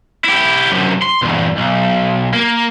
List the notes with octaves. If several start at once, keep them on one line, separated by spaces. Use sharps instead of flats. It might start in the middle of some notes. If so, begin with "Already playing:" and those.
E4 G4
F#2 C3
C6
E2 G2
B1
A#3